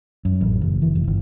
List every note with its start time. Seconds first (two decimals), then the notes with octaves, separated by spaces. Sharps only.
0.25 F#2
0.41 A1
0.61 F#1
0.82 E3
0.95 F1
1.07 G1